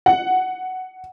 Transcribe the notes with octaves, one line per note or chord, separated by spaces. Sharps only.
F#5